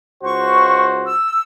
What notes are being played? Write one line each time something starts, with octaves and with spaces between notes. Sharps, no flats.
C#2 F#4 C5 C#6
E6